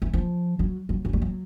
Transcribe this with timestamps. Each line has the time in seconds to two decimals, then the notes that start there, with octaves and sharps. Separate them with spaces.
0.02 E3
0.14 F3
0.59 F#3
0.89 F#3
1.05 F#3
1.13 G3
1.22 F#3